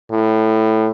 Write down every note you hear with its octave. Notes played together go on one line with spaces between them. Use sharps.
A2